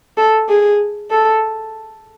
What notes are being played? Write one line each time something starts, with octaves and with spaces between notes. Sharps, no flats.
A4
G#4
A4